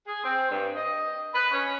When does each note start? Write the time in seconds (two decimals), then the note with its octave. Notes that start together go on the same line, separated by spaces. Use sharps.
0.06 G#4
0.24 C4
0.50 G2
0.75 D#5
1.33 B4
1.51 C#4